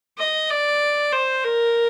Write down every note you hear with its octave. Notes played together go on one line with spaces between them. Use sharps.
D#5
D5
C5
A#4